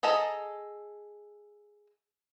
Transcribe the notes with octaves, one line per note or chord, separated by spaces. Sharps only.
G#4 A4 D#5 A5 A#5